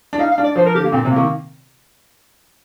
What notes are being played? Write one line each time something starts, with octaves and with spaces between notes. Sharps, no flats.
D4
D#4 F5
F5
D4
D5
F3 C5
A#4
D3 G4
A#3
A#2 C4
C3
A#3
D#3